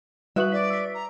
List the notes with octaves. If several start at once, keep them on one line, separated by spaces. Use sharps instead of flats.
G3 F#4 B4 E5 D#6 F#7
D5 B6
E6 B6
A#5